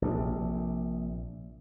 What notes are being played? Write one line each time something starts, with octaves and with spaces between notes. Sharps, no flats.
A#1 C3